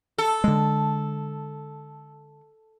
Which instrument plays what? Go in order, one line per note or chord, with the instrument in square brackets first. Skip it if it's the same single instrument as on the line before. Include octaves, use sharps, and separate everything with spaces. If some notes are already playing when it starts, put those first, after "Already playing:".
[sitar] A4
[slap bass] D3 G#3